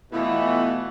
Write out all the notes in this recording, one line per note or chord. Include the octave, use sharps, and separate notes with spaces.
B2 E3 A3 B3 E4 F4 F5 F#5